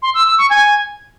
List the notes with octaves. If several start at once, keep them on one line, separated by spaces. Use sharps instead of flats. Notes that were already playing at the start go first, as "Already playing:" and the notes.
C6
E6
E6
C#6
G#5